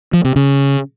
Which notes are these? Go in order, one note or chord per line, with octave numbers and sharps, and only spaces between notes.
F3
C3
C#3